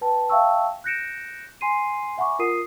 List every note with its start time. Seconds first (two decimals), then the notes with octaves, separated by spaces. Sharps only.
0.01 B4 G5 A5
0.30 E5 F5 G5 A5 C#6 E6
0.84 F#6 G6 A#6 C#7 D7 E7
1.61 G#5 C6 C7 D#7
2.18 E5 F#5 G#5 B5 C#6 D6
2.39 F4 A#4 D#6 C7 D#7